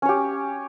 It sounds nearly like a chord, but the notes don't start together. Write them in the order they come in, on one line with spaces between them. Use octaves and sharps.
C#4 C#5 G4